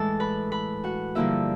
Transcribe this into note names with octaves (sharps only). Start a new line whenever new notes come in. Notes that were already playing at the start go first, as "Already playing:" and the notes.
Already playing: A2 E3 G#3 A4 A5
B4 B5
B4 B5
F#4 F#5
G2 D3 F3 A#3 E4 E5